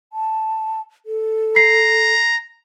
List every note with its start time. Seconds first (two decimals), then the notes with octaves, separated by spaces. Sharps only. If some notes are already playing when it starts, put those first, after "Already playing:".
0.13 A5
1.06 A4
1.56 A#5 C7